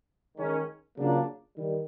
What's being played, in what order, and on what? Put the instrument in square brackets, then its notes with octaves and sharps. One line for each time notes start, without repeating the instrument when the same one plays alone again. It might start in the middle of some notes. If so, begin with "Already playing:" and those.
[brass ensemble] D#3 G#3 C#4
C#3 F#3 A#3 D4 F4
D#3 G3